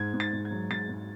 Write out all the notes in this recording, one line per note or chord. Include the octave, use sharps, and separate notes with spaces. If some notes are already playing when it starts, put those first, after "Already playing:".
Already playing: G#2 G#6
G#2
A6
G#2
G#6
F#3
G#2 A6
G#2